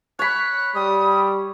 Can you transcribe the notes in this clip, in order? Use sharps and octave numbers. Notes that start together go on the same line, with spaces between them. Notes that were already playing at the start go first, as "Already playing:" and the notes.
C#5 B5 F#6
G3 D#6